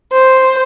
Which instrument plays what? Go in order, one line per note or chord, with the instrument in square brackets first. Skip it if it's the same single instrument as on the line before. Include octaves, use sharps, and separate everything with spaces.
[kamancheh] C5